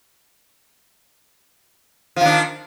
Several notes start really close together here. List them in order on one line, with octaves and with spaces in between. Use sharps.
F3 D#3 D4